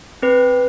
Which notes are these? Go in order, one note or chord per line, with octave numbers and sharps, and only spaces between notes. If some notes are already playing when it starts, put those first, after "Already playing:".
C4 B4